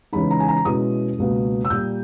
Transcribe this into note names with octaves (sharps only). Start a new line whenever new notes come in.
C#3 E3 G#3 D#4 B5
A#5
G#5
A#5
B2 G#3 C#4 E4 D#6
C#2 B2 A#3
E6
A#2 G3 A#3 G6